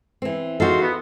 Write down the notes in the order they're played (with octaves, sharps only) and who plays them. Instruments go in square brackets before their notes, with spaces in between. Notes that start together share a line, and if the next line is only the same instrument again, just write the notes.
[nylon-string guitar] E3 C4
[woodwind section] G#3 F5 C6 [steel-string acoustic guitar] D#4 F#4 [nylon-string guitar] A4
[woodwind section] B3